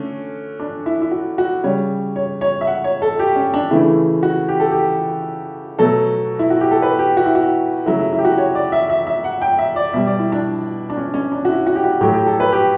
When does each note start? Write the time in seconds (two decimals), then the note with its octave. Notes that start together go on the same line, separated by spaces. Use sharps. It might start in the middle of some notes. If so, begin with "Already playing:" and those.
Already playing: D3 A3 C#4
0.60 D4
0.86 E4
1.02 E4
1.11 F#4
1.38 F#4
1.63 C#3 G3 C#5
2.16 C#5
2.41 C#5
2.61 E5
2.67 F#5
2.84 C#5
3.02 A4
3.19 G4
3.36 C#4
3.54 D4
3.71 C#3 E3 A3 E4
4.23 F#4
4.49 G4
4.60 A4
4.71 G4
5.79 B2 F#3 A3 A4
6.39 E4
6.50 F#4
6.61 G4
6.71 A4
6.82 B4
6.99 G4
7.17 F#4
7.26 E4
7.35 F#4
7.86 C#3 F#3 A3 E4
7.99 E4
8.12 E4
8.18 G4
8.25 F#4
8.38 C#5
8.55 D5
8.72 E5
8.89 E5
9.07 E5
9.24 F#5
9.42 G5
9.59 E5
9.76 D5
9.93 B2 G3 E5
10.06 D5
10.19 E4
10.32 D4
10.90 D4
10.97 C#4
11.14 C#4
11.32 D4
11.45 F#4
11.49 E4
11.66 F#4
11.75 G4
11.84 F#4
12.01 A2 F#3 A3 G4
12.13 G4
12.27 A4
12.40 B4
12.52 G4